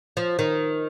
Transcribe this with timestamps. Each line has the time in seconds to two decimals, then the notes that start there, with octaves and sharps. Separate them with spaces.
0.17 F3
0.39 D#3